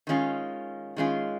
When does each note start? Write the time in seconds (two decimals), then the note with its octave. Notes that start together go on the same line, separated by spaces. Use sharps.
0.07 D#3 G#3 C#4 F4
0.96 D#3 G#3 C#4 F4